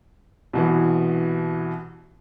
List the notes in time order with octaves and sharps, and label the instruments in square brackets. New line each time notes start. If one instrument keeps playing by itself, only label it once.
[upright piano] C2 B2 E3